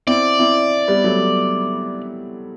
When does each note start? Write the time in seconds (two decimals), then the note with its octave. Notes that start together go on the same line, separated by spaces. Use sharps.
0.07 C4 E4 D5
0.39 C4 E4
0.88 G3 B3
1.04 F#3 A3